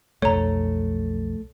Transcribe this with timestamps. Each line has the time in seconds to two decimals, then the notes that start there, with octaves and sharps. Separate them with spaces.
0.22 B1 F2 A3 C#5 A#5